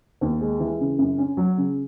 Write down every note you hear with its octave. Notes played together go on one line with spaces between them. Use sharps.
D#2
G#3
E3
C#3
F#2
C#4
F#3
C#3